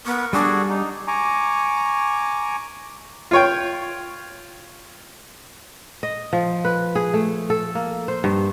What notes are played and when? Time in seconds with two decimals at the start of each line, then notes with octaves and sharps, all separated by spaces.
0.06 B3 A#4 C#6
0.33 G3 D4 F#4 G#4 A4 G#5
0.69 D#4
1.08 G#5 A#5 C#6 D6
3.31 F4 C#5 G5
6.03 D#5
6.33 F3
6.65 B4
6.95 G#4
7.14 A3
7.50 A4
7.75 A#3
8.08 C5
8.24 G2